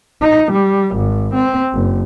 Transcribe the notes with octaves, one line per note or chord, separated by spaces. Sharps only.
D#4
G3
G#1
C4
F#1